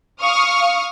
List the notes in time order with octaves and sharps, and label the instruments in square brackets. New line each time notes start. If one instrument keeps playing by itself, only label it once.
[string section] F5 C#6 D#6 F6